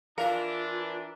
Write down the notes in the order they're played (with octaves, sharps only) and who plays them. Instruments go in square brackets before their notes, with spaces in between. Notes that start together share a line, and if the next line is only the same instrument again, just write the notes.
[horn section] E3 D4 [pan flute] F4 [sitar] A#4 [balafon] F5